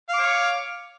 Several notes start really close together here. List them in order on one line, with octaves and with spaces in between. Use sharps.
F5 D6 C#5